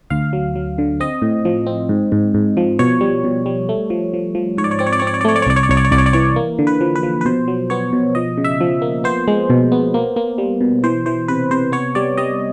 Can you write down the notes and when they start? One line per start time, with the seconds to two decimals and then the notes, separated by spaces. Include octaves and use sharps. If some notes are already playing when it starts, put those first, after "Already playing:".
0.10 D2 F5
0.33 F#3
0.55 F#3
0.78 D3
1.00 C4 D#5
1.22 A2
1.45 F3
1.67 C4
1.89 G#2
2.12 G#2
2.34 G#2
2.57 F3
2.79 B2 C#5
3.01 G3
3.24 B2
3.46 G3
3.69 A3
3.90 F3
4.14 F3
4.35 F3
4.57 G#2 C#5
4.64 D5
4.71 C#5
4.79 C4 D5
4.87 C#5
4.93 D5
4.99 C4 C#5
5.07 D5
5.14 C#5
5.21 D5
5.25 A3 C#5
5.36 D5
5.42 C#5
5.46 C2 D5
5.56 C#5
5.63 D5
5.69 C2 C#5
5.77 D5
5.84 C#5
5.92 C2 D5
5.98 C#5
6.06 D5
6.13 E3 C#5
6.36 A#3
6.59 D3
6.67 B4
6.81 F3
6.95 B4
7.03 F3
7.21 B4
7.25 B2 C5
7.48 F#3
7.70 B3 C#5
7.93 B2
8.15 F3 D#5
8.38 C#3
8.44 E5
8.61 F3
8.82 A#3
9.04 B3 C5
9.28 G#3
9.50 B2
9.72 B3
9.94 A#3
10.16 A#3
10.38 G3
10.61 B2
10.83 E3 C5
11.06 E3 C5
11.28 C3 B4
11.51 C3 C5
11.72 B3 C#5
11.95 G3 D5
12.18 G3 D#5